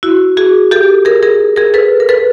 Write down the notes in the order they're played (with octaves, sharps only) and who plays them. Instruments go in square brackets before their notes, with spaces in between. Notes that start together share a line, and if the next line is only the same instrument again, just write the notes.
[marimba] E4 F#4
F#4 G#4
G4 A4
G#4 A#4
G#4 A#4
G#4 A#4
A4 B4
A#4
A4 B4